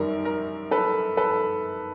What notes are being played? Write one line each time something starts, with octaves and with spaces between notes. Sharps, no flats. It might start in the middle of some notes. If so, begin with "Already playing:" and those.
Already playing: F#2 D#3 G3 A#4
A#4
A4 B4
A4 B4